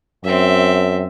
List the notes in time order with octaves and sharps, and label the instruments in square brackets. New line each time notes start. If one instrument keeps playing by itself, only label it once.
[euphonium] F#2 [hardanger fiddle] C4 E5